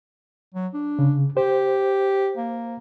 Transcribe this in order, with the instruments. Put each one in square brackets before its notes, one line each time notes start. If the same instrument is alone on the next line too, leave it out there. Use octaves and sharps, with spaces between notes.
[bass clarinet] F#3
D4
[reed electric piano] C#3
[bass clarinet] G4 [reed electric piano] C5
[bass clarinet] A#3